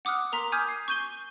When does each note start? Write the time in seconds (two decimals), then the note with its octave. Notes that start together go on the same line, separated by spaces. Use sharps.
0.05 F#5 D6 D#6 F6 F#6
0.32 A#4 A#5 C6 B6
0.52 G#5 D6 D#6 F6 G6 G#6
0.69 C7
0.88 C#6 G6 D#7 G7